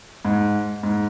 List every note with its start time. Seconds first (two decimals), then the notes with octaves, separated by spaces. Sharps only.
0.25 G#2
0.83 G#2